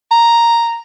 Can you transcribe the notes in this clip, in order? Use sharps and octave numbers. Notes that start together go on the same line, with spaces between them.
A#5